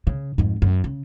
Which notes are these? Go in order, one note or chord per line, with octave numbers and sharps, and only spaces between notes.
C#3
F2 G#2
F#2
C#3